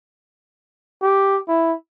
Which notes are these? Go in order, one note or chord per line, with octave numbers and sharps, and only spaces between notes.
G4
E4